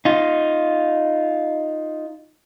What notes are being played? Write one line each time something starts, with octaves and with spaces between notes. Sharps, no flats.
D#4 F4